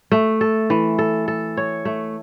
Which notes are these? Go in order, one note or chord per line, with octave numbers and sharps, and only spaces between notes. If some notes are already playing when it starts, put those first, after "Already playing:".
A3
A4
E3
A4
A4
C#5
A3